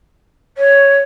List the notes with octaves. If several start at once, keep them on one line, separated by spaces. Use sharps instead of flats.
C#5